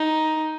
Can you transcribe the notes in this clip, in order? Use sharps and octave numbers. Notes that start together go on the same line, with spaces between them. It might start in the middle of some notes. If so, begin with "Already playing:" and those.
Already playing: D#4